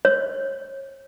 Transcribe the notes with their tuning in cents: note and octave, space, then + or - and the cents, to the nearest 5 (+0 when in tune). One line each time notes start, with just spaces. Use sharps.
C#5 -35